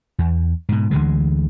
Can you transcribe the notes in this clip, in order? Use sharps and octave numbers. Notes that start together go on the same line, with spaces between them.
E2
G#2 B2
D2 D3 E3 G#3